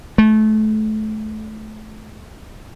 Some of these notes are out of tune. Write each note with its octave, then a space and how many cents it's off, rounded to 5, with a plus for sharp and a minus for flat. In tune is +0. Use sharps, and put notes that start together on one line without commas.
A3 -25